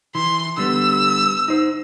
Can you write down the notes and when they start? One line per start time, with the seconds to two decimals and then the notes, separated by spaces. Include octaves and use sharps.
0.15 E3 C6
0.57 D3 G3 B3 E6
1.48 D#4 C5